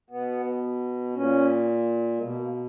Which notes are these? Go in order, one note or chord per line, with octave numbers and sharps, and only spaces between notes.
B2 B3
A#2 C#4
B2 G#3
A#3
A#3